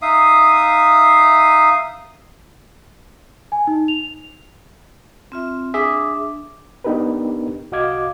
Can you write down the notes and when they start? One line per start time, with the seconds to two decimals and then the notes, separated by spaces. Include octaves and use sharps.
0.02 D#4 E5 F5 D#6
3.52 G#5
3.67 D#4
3.88 F7
5.32 C4 F4 E5
5.74 D4 G#4 E5 D6
6.84 B3 D4 D#4 G4 A#4 B4
7.72 C2 F#4 D#5 F5 D6 G#6